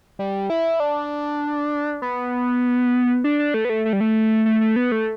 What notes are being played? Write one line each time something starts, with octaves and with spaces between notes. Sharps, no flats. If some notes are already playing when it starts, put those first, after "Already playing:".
G3
E4
D4
B3
D4
D4
A3
B3
A3
A3
G3
A3
A3
A3
B3
A3